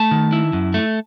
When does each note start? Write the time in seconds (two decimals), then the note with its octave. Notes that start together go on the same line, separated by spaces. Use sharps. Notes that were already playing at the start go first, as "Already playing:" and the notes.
Already playing: A3 A5
0.11 D#3
0.33 E4
0.53 F#2
0.74 A3